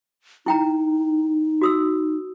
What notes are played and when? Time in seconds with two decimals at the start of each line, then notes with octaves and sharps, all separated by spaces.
0.46 D#4 E4 G5 A#5
1.61 F#4 D#6 E6